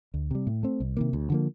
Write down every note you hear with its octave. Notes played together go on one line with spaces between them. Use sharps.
D2
C3 G3
A2
A3 C4
C2
C3 D#3 A#3
D2
D3 F3 A#3